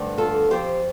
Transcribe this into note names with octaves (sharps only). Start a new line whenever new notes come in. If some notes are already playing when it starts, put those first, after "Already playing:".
Already playing: G2 D3 A3 C4
F4 A4
F2 F3 C4 G4 C5